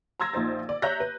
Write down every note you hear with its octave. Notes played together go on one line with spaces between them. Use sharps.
A#5 C6 E6 G#6 A#6
A#1 A#2 D#4 C5 A6
D5
C#5 E5 A#5 F#6 G6 A#6
B4